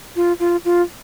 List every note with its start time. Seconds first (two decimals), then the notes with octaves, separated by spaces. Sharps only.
0.16 F4
0.40 F4
0.65 F4